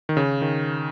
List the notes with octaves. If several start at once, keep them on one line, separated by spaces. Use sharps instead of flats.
D#3
C#3
D#3